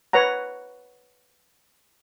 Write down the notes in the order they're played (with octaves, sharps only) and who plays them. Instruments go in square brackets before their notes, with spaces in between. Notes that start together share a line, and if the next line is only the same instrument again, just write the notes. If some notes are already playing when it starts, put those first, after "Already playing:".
[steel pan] B4 C#5 F#5 A#5